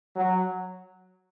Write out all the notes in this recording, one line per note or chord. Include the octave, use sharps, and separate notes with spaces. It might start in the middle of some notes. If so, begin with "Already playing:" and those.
F#3